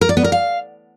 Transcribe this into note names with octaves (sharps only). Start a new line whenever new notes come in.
A#4
D5
B3
A#4
F5